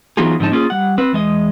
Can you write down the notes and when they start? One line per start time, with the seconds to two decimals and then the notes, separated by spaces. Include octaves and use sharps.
0.17 E3 F#3 B3 D#4 F4 G#4
0.40 G#2 D3 F3 C#4 D#4 A5
0.52 A#3 C#4 F4 G#4
0.70 G3 F#5
0.98 C4 B4
1.13 E2 G#3 D#5